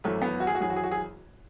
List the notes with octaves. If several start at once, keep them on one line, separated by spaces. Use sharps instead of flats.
G#1 F#2 E3 A3
B3
F#4
G#4
F#4
G#1 F#2 E3 G#4
F#4
G#4
F#4
G#4